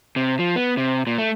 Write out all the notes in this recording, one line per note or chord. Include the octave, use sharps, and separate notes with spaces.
C3
F3
B3
C3
A#2
A3